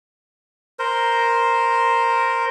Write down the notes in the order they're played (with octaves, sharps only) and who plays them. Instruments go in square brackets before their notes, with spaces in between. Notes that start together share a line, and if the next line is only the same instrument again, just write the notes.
[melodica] A#4 C5